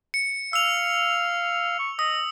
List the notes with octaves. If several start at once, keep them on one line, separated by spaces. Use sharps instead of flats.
C#7
F5 E6 F7
C#6
D#5 D#6